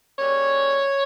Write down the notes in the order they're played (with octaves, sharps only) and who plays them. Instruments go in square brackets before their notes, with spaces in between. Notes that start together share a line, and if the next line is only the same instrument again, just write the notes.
[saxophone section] C#3 G3 A#3 C#5